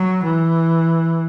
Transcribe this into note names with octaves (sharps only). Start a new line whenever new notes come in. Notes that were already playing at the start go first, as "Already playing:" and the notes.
Already playing: F#3
E3